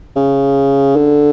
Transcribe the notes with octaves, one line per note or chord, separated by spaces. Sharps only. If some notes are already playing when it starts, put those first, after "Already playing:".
C#3
D3